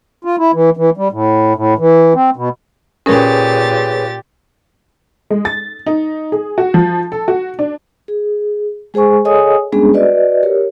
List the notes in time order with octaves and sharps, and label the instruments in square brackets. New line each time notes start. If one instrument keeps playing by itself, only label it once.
[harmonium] F4
E4
E3
E3
G3
A2
A2
E3
C4
B2
[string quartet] A#2 G4 A6 [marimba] C#4 A#4 [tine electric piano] G#4 B4 C#5
[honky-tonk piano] G#3
A6
D#4
G#4
F#4
F3
A4
F#4
D4
[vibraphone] G#4
G#3 G#4 C5 G#5 C#6
G#4 A4 C#5 D#5 G#5 D#6
G3 G#3 B3 C#4 D4 G#4
F#4 B4 D5 D#5
G4 A#4 C#5